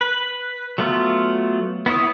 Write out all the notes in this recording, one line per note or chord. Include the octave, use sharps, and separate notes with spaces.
B4
F#3 A3 B3 F4
B3 E4 C#5 D#6